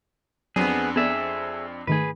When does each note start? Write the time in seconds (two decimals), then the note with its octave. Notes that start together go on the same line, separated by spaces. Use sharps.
0.56 F2 F#3 B3 C4 D4 G#4
0.96 B3 G#4 A4 D5 E5
1.87 G#2 D#3 A3 G#4 B4